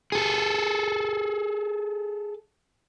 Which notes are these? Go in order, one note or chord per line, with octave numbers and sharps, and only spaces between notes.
G#4 A4